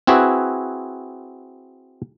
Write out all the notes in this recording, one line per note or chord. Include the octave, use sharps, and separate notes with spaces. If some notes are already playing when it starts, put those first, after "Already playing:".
C4 E4 F#4 G#4 B4